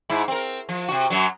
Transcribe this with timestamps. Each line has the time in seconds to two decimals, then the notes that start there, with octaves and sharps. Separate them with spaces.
0.09 G#2 E4
0.28 C4 A#4
0.69 F3
0.88 C3 F#4
1.10 F#2 F#3